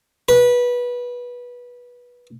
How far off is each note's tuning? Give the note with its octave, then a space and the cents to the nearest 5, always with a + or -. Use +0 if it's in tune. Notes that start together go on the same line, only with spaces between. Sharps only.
B4 -20